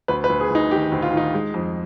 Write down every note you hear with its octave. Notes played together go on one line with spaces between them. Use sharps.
D2 B4
B4
D2
G#4
D2 D#4
D#3 G4
D2
F4
D#3 D#4
G#3
F2